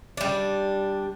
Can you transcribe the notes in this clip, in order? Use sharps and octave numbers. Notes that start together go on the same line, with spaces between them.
G3 D4